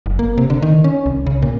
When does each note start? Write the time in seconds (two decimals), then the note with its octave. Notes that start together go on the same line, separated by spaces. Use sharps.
0.06 F#1
0.19 A#3
0.38 C3
0.50 D3
0.62 D#3
0.84 C#4
1.06 C2
1.26 C#3
1.42 A#2